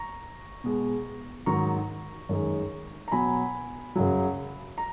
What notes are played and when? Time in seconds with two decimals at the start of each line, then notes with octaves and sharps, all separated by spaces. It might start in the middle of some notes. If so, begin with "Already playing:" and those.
Already playing: A#5 C#6
0.64 B2 G#3
1.46 G#2 D#3 F#3 A#5 C#6
2.29 F#2 D#3 G#3
3.08 A#5
3.12 B2 F#3 G#5 B5
3.95 F#2 C#3 F#3
4.78 A#5